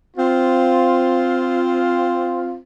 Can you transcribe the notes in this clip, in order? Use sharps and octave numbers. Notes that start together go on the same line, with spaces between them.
C4 F4